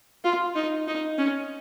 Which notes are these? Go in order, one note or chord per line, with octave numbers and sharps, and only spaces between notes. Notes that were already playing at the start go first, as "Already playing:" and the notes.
F4
D#4
D#4
C#4